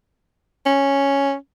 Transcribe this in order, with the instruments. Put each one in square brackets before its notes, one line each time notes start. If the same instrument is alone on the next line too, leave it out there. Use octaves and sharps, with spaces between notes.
[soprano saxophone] C#4